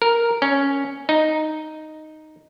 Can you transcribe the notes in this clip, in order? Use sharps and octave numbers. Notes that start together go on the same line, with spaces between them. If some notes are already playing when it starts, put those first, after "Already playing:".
A#4
C#4
D#4